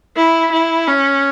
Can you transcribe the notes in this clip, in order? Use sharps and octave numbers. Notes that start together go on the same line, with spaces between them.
E4
E4
C#4